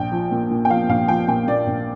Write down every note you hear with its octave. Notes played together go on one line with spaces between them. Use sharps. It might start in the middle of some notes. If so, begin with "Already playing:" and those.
Already playing: A#1 G5
F3
A#2
A#2
G5
F3 F5
A#1 F5
F3 G5
A#2 G5
A#2 D5
A#1